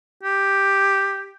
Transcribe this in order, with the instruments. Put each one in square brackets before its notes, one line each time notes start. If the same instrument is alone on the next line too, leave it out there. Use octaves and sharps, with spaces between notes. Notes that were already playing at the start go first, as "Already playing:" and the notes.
[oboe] G4